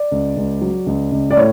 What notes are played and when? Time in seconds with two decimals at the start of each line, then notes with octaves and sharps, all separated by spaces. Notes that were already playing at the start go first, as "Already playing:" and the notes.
Already playing: D5
0.12 C#2
0.37 C#2
0.61 F#3
0.86 C#2
1.12 C#2
1.31 D5
1.37 A2 C#5